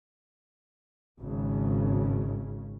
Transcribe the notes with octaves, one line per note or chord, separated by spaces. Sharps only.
G#1 C#3